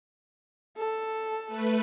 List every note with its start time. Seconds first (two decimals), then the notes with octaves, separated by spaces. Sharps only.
0.78 A4
1.47 A3 B4